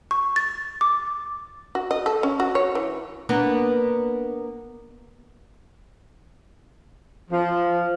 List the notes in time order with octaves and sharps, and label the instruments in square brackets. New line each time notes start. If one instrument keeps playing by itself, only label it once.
[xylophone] C#6
A6
D6
[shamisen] F#4
D#5
A4
C#4
F#4
C#5
E3
[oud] A#3 B3 D4
[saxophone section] F3